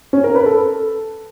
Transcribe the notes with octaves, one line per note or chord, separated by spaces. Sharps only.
C#4
A#4
B4
A4